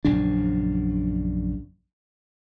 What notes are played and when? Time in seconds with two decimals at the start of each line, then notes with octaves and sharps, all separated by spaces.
0.05 A#1 F#2 C#3 D4